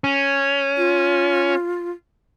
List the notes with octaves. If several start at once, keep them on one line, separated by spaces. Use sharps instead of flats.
C#4
F4